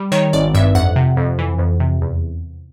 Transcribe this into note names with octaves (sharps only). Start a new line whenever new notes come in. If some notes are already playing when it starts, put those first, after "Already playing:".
Already playing: G3
D#3 C#5
G#1 D5
G2 E5
F2 F#5
C3
F2
E3
F2
C3
E2